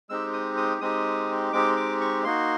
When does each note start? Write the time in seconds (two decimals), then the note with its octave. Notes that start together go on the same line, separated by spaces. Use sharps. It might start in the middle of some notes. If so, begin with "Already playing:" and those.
0.09 G#3 C4 D#4 G4 E6
0.33 D#6
0.57 D#6
0.81 G#3 C4 D#4 G4 D#6
1.53 G#3 C4 D#4 G4 D6
1.77 D6
2.01 C#6
2.24 A#3 D#4 F#4 C6